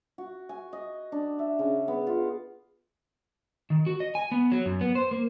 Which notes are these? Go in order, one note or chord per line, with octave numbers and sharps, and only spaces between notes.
F#4
G#5
D#5
D4
E5
C#3
B3
F4
D#3
F#4
D#5
G#5
B3
F#3
F#2
B3
C5
A#3